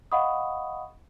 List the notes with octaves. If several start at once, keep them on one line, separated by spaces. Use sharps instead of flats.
D#5 F5 F#5 B5 C#6 D#6